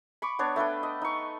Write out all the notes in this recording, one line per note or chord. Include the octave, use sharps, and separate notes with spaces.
B5 C#6 D6
B3 D4 C#5
A3 D4 B4 G5
D#5
D#4 C#6